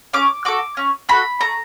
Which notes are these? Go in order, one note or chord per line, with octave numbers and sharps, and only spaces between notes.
C#4 D6
F#4 A4 D6
C#4
F#4 A4 B5
A3 A#5